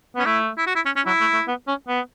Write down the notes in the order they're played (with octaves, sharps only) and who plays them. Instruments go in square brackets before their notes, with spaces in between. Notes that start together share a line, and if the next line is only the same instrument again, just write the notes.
[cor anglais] B3 [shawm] C#4
[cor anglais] A3 [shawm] E4
[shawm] E4
F#4
E4
C#4
C#4
[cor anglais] F#3 [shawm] E4
[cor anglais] A3
A3
B3
C#4
B3